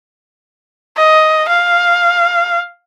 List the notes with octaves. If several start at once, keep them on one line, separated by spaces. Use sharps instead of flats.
D#5
F5